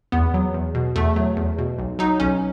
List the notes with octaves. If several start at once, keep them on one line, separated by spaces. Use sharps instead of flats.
E2 B3
F#3
E2
B2
E2 A3
F#3
E2
B2
B1
F#3 D#4
B1 C#4